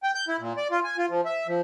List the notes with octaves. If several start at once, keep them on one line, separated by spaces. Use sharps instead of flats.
G5
G6
E4
A#2
D5
F4
G#5
F4
F3
E5
F3